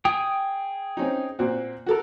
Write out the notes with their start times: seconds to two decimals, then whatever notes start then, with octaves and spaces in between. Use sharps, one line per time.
0.05 G#4 G5 D#6
0.97 C4 C#4 D#4
1.39 A#2 C4 F#4
1.86 F#4 A4 A#4